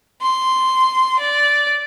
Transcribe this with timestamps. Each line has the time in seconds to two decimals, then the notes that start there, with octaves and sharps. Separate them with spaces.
0.22 C6
1.19 D5